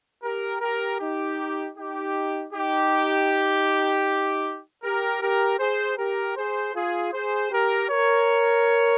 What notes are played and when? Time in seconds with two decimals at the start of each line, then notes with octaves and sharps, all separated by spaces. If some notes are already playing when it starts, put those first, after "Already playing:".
0.23 G4 A#4
0.61 G4 A#4
0.99 D#4 G4
1.76 D#4 G4
2.53 D#4 G4
4.83 G4 A#4
5.21 G4 A#4
5.59 G#4 C5
5.98 G4 A#4
6.36 G#4 C5
6.74 F4 G#4
7.13 G#4 C5
7.51 G4 A#4
7.89 A#4 C#5